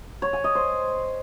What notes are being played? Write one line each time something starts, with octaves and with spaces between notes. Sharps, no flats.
C#5
G#5
D#5
C5